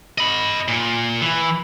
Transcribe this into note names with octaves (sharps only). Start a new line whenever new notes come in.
D#5 B5
A#2
E3